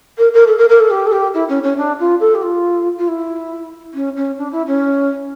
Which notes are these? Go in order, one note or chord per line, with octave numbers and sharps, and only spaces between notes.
A#4
A#4
A4
A#4
A#4
A4
G4
A4
G4
E4
C#4
C#4
D4
F4
A4
G4
F4
F4
E4
C#4
C#4
D4
E4
C#4